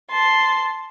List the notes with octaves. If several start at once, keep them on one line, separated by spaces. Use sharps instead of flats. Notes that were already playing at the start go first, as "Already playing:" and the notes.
A5 C6